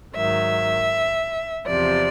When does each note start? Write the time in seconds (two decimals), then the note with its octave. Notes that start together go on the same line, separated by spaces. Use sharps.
0.16 G#2 D#3 F#3 E5
1.67 E2 C3 F3 D5